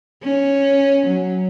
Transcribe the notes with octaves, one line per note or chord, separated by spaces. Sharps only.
C#4
F#3